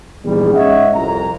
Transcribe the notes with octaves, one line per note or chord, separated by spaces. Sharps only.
A#1 E2 G#2 G3 G#4
G#2 C#4 C#5 D#5 E5 F#5
C2 F2 A#5